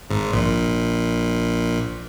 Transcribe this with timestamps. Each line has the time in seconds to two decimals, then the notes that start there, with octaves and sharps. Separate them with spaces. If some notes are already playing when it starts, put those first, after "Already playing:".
0.10 G#1 G#2
0.33 A#1 A#2